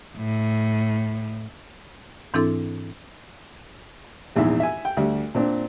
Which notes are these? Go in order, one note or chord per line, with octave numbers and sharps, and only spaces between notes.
A2
G#2 E3 C4 D4 E4 A4
A#1 E2 G#2 D#4 E5
E5 G#5
G5
D2 G3 E5
A#2 C4 D4